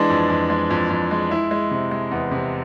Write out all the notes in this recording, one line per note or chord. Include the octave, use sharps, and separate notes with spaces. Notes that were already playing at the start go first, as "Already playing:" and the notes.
Already playing: E3 G#3 D4
F2
F2
G#3
F2
F2
G#3
G#3 E4
G#3
C3
G#3
E2
C3